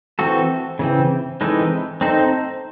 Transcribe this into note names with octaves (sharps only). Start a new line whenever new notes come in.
E3 C4 F#4 A4
C#3 E3 C4
E3 G#3 C4 D#4 A4
C4 D#4 A4 C5